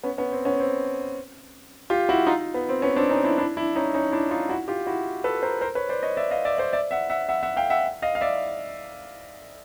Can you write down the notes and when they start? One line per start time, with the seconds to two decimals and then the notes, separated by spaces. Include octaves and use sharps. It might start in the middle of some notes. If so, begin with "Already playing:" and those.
0.03 B3 C#4
0.18 B3 C#4
0.32 C4
0.45 B3 C#4
0.60 C4
1.90 F4 G4
2.09 E4 F#4
2.27 D#4 F4
2.54 B3
2.69 C4
2.82 B3 C#4
2.96 C4 D4
3.10 C#4 D#4
3.24 D4 E4
3.38 D4 E4
3.57 D4 E4
3.76 C#4 D#4
3.94 C#4 D#4
4.12 D4 E4
4.31 D#4 F4
4.49 E4 F#4
4.68 F4 G4
4.87 E4 F#4
5.24 A4 B4
5.42 A#4 C5
5.61 A#4 C5
5.75 B4 C#5
5.89 C5 D5
6.03 C#5 D#5
6.17 D5 E5
6.31 D#5 F5
6.45 D5 E5
6.58 C5 D5
6.73 D5 E5
6.91 E5 F#5
7.10 E5 F#5
7.29 E5 F#5
7.43 E5 F#5
7.57 F5 G5
7.70 E5 F#5
8.02 D#5 F5
8.15 F5
8.21 D5 E5